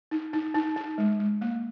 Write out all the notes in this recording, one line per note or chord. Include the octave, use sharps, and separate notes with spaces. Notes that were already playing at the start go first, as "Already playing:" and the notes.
D#4
D#4
D#4
D#4
G#3
G#3
A#3